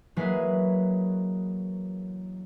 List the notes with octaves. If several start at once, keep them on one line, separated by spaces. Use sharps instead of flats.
E3 F#3 G#3 A#3 G#4 B4